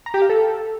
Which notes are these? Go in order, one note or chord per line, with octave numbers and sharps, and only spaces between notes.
A#5
G4
F5
A4